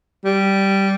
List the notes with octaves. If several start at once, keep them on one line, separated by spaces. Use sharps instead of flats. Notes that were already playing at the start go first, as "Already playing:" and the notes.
G3